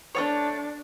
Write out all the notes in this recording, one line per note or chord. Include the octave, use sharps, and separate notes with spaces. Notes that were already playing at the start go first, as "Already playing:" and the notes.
A3 B3 D4 C#5